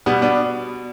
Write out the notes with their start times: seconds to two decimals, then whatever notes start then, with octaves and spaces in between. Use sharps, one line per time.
0.06 B2 G3 B3
0.22 B3 D4